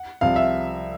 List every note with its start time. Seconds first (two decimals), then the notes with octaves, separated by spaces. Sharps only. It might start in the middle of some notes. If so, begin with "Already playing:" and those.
Already playing: F#5
0.21 C2 C3 F3 F5
0.36 E5